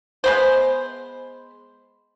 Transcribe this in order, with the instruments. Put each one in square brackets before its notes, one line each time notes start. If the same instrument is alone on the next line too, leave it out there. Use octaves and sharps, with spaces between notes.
[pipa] G#3 B3 C5